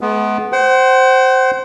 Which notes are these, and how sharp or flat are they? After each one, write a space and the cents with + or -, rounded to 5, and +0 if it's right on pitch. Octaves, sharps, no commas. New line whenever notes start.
G#3 +45 B3 +5
C5 +0 F#5 +40